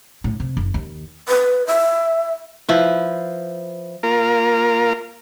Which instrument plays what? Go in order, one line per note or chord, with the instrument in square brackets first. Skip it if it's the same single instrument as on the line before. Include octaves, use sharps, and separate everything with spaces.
[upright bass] A2
C3
F#1
D#2
[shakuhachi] B4
E5
[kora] F3 E4 B4
[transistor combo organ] A#3 F4 A#4